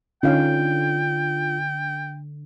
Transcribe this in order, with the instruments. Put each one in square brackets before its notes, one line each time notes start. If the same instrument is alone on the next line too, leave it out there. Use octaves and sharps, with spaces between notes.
[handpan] D3 [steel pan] C#4 D#4 F5 [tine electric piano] F4 [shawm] G5